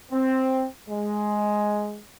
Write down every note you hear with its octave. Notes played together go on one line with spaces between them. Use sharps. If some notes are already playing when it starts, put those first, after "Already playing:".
C4
G#3